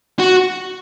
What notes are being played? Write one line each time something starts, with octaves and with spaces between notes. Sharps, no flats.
F#4